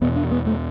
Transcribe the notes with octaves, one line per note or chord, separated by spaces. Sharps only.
E2 B2 B3
D4
B3
A3